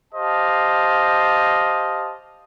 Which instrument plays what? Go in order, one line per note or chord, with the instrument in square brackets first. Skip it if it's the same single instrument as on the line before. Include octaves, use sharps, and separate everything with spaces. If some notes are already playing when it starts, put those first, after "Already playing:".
[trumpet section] G4 C5 D#5 F5 A5